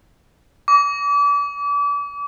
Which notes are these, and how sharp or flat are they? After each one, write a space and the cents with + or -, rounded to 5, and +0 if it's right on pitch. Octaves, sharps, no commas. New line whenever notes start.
D6 -35